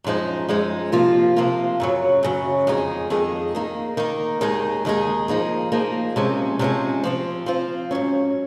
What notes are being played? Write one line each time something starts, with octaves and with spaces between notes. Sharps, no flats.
F#2 F3 G#3 D#4
F#2 F3 G#3 D#4
C3 F3 A#3 F4
C3 F3 A#3 F4
F#2 C#3 F#3
F#2 C#3 F#3
F2 D#3 G#3 D#4 G#4
F2 D#3 G#3 D#4 G#4
D#3 A#3 D#4
D#3 A#3 D#4
D#2 D#3 G#3 D#4 G#4
D#2 D#3 G#3 D#4 G#4
F3 A#3 D#4 G#4
F3 A#3 D#4 G#4
C3 F3 G#3 C#4
C3 F3 G#3 C#4
F3 C4 F4
F3 C4 F4
G#2 F#3 C#4